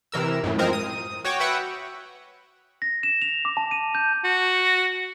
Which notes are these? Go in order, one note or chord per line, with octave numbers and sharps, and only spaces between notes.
C3 E3 A#4 E6
F#2 A2
F3 G#3 C4 A#4
D#6
F#4 C#5 G5 D6
F#4 B4 E5 F#5 G5
A#6
E7
F7
D6
A5
D#7
G6
F#4